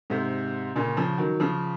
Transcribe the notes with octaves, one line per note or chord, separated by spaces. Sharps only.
G#2 C3
A#2 C#3
C#3 F3
D#3 F#3
C#3 F3